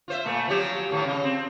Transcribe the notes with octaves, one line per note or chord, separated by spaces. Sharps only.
F4 C5 E5
A#2 A3
F3 F#3 G4
A2 D#3 F3
C#3 D#5
C4